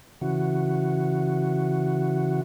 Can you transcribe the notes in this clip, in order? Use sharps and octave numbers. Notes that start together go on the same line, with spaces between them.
C#3 E3 F#4